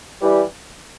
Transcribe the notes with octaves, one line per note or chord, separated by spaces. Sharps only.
E3 G3